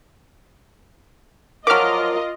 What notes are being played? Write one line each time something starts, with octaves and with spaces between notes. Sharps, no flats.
F3 F#3 F4 A#4 D#5 D6 F6